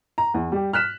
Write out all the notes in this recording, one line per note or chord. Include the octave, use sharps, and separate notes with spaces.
A#5
E2
G3 G4
F6 F#6 B6 E7